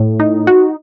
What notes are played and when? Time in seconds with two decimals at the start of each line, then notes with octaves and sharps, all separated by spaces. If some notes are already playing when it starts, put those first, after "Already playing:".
Already playing: A2
0.20 D#4
0.47 F#4